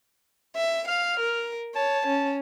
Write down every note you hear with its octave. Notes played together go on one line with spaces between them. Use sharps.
E5
F5 F6
A#4
C#5 A5
C#4